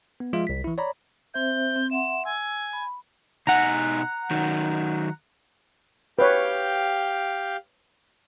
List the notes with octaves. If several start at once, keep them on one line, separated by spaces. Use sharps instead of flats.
B3
F3 G#3 F4 E5
C2 B6
E3 E4
C#5 D5 A#5 B5
C4 C5 E5 G6
C4
E5 F#5 C6 E7
G#5 E6
B5
B2 D#4 F#5 G#5 A#5
D#3 F#3 D#4
G4 B4 C#5 F5 G5